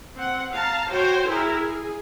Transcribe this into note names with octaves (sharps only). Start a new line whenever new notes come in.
C4 F#5
F5 A5 A#5
F#4 C5 C#5 G5
E4 G#4 A#4
G#4